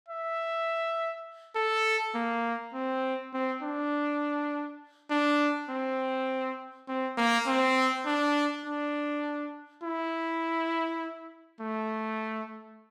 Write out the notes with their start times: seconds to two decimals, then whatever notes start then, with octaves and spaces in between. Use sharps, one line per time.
0.08 E5
1.56 A4
2.15 A#3
2.74 C4
3.34 C4
3.63 D4
5.10 D4
5.69 C4
6.88 C4
7.17 A#3
7.47 C4
8.06 D4
8.65 D4
9.83 E4
11.61 A3